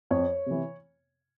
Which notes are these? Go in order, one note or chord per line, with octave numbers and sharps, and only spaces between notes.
F2 C#5
C3 E3